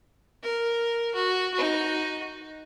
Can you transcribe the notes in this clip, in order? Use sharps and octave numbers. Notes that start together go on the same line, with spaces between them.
A#4
F#4
D#4 F#4